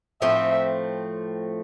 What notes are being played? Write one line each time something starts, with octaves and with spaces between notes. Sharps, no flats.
A2 F3 A3 C4 E5